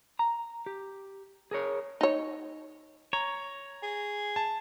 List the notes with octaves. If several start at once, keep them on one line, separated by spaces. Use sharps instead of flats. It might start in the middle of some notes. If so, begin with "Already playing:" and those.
A#5
G4
G#4 A#4 C#5
D#4 C#5
C#5 A#5
G#4
A5